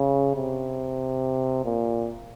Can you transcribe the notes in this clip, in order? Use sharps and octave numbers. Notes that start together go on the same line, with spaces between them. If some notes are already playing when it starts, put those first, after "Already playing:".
Already playing: C#3
C3
A#2